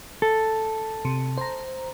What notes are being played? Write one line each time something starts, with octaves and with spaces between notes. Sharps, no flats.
A4
C3
C5 A#5